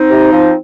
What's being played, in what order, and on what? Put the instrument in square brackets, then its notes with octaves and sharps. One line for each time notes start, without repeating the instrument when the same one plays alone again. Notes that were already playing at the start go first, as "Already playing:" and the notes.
Already playing: [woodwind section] C4 D#4
C3
F3